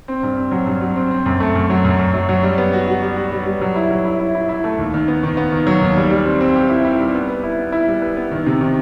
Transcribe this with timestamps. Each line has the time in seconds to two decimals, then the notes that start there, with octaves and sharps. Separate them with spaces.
0.08 C4
0.23 G2
0.37 C4
0.51 F#3
0.67 G2
0.81 F#3
0.96 C4
1.11 C4
1.26 F#2
1.40 A3
1.55 F#2
1.70 F#3
1.85 F#2
1.99 F#2
2.14 F#3
2.29 F#3
2.43 G3
2.58 B3
2.73 F#4
2.88 F#4
3.02 G3
3.17 F#4
3.32 G3
3.46 G3
3.61 F#3
3.76 E4
3.91 F#3
4.05 E4
4.20 E4
4.35 E4
4.49 E4
4.64 A3
4.78 D#2
4.94 D#3
5.08 B3
5.23 D#3
5.37 B3
5.52 D#3
5.67 F#3
5.81 D#2
5.96 G3
6.10 G3
6.25 C4
6.41 C4
6.56 G4
6.69 E4
6.85 E4
6.99 G3
7.15 B3
7.29 B4
7.44 E4
7.58 B3
7.72 E4
7.88 G3
8.02 B4
8.17 B3
8.31 D#3
8.46 C3
8.61 D#3